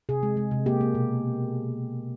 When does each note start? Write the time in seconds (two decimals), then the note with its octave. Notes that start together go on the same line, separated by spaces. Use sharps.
0.09 C3 G#4
0.23 G#3
0.37 G#3
0.51 C3
0.66 A#3 G4
0.81 A#3
0.95 B2